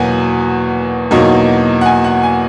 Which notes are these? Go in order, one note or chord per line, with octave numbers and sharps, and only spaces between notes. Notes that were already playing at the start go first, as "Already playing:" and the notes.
Already playing: E2 B2 F#3 A#3 F#5 G#5
E2 B2 F#3 A#3 D#4
F#5
G#5
F#5
G#5